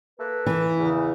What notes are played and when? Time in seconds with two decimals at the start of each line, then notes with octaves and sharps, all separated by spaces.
0.19 A#3 A4 B4
0.46 E3
0.79 E2 C#3